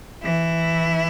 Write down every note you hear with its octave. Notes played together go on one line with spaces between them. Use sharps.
E3 E4